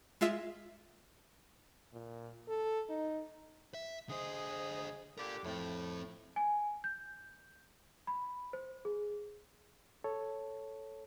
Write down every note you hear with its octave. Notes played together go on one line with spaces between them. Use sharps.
G#3 F4 E5
A#2
A4
D#4
E5
D3 G#4 C5 D#5
D3 G4 A#4 D5
F2 A2 C4
G#5
G6
B5
C5
G#4
A4 C#5